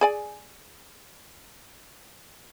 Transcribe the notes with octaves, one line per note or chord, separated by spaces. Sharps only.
G#4 D5 G#5